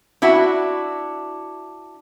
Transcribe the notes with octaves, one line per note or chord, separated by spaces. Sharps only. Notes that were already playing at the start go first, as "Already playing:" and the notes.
D4 E4 F#4